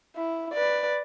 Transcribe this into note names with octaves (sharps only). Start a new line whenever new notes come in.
E4
B4 D5